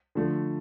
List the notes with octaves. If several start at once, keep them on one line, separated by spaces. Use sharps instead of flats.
D3 F3 A3